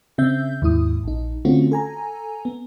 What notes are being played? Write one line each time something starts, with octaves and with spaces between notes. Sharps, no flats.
C#3 C4 E5 G6
D#2 G#2 E4 D#6
A#1 D#4
D3 A3 C4 C#4 F4 F#4
A4 G#5 A#5
B3